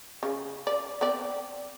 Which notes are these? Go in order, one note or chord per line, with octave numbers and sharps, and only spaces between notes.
C#3
D5
B3 C4 D5